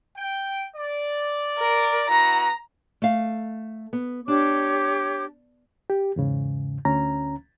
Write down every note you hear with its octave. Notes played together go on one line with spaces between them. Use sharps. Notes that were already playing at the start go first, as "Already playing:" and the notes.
G5
D5
A#4
B3 E4 F#4 A#5
A3 F5
B3
D4 G4 C#5 D6
G4
E2 G#2 C#3
D2 C#4 A#5